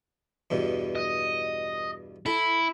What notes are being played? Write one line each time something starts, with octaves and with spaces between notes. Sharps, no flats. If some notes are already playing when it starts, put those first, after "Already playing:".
E2 G2 B2
D#5
E4 A4 E5